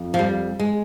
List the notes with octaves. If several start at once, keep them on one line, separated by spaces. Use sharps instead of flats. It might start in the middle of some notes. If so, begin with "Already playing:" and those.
Already playing: F2
F3
G3
G#3